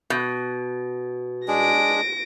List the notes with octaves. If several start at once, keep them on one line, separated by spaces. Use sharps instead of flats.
B2
G#3 D4 G#4 A#6 D7